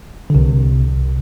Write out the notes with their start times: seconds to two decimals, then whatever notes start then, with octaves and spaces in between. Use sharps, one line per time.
0.30 D3
0.35 C2 C3